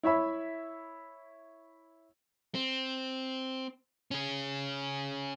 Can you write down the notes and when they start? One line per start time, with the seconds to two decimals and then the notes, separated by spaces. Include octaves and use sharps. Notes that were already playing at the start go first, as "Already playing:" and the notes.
0.03 E4 C#5 E5 B5
2.55 C4
4.11 C#4 G#4